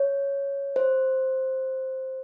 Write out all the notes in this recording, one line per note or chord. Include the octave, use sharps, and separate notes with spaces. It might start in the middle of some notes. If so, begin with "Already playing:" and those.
Already playing: C#5
C5